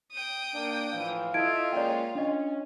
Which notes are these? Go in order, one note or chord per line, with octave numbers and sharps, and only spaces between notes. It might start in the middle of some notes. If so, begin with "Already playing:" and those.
G5 D#6
A#3 D4
A2 E3 F3 F5
E4 F4 A4 D#5 E5 G#6 D7
G#3 A#3 C#4 D5 G5
C#4 D4 D#5